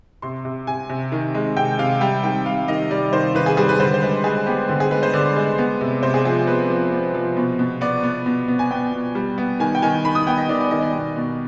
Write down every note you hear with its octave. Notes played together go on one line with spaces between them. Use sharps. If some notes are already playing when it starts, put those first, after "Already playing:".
C3 C6
C3
C3 G#5
C3
D#3
G#3
C3 G5
C3 F5
G3 G5
D#3 G5
G3 F5
D#3 D#5
G3 D5
D#3 C5
D#3 B4
G#4
G3 G#4
B4
D3 C5
C5
G#3 B4
G#3 G#4
B3 G4
D3 G4
G#4
G#3 B4
C5
D3 D5
G#3
B3
C3
C3 C5
G#4
F3 G#4
B3 B4
F3
B3
F3
B2
B2
B3 D5
B3
B2
B3
G#5
B3 G5
B2
G3
B3
D#3 G#5
G5
D#3 G#5
D#3 B5
D#6
B3 G5
D#5
D#3 D5
D5
D#3 D#5
D5
B2
B2